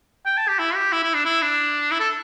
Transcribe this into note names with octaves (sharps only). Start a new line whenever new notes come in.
G5
A5
G4
E4
G4
E4
E4
D4
E4
D4
E4
A4